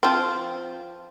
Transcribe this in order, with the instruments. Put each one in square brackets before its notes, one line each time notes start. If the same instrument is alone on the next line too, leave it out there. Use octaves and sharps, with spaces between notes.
[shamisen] F3 C4